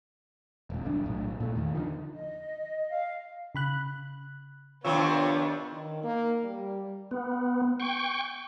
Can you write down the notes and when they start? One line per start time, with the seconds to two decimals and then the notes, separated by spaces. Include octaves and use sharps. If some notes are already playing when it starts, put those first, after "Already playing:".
0.70 E1 C2
0.85 F#1 A2 E3 D4
1.04 B1 A2
1.40 A#2 A3
1.55 E2 D#3
1.75 D3 D#3 F3
2.15 D#5
2.89 F5
3.55 C#3 B5 F#6
4.85 C3 D#3 F3 B3 D4 F4 C#5 E6
5.73 D#3
6.04 A#3
6.44 G3
7.11 B3
7.80 G5 C#6